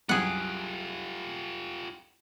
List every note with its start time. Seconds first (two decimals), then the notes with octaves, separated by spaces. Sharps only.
0.09 C2 F#2 F4 G4 G#4 F#5